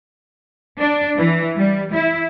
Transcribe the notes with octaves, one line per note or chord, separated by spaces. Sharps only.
D4
E3
G3
E4